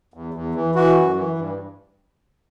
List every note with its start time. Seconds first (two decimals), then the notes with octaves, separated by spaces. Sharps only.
0.14 E2
0.34 E2
0.55 E3
0.75 E3 F#4
0.96 F#2
1.16 E3
1.38 G2